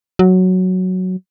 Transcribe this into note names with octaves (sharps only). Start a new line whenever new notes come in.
F#3